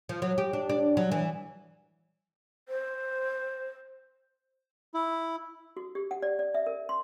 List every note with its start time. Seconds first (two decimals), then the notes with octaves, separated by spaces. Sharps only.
0.09 F3
0.22 F#3
0.38 G4
0.53 D4
0.69 D4
0.97 F#3
1.12 E3
2.69 C5
4.94 E4
5.77 F#4
5.95 G4
6.11 F#5
6.22 D5
6.39 D5
6.54 E5
6.66 A#4
6.89 C6